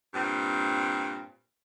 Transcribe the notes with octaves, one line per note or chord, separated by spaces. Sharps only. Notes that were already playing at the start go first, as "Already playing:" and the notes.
G2 A#2 C4